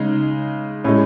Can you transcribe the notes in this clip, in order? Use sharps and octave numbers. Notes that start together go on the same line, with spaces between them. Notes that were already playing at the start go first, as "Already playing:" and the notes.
Already playing: C#3 G#3 D#4
A2 G#3 C#4